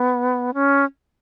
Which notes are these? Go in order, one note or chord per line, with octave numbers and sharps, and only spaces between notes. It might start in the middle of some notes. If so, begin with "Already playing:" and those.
Already playing: B3
C#4